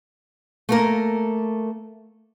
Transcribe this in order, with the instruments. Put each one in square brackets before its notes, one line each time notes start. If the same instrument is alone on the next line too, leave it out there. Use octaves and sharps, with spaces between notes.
[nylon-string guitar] A3 A#3 A#4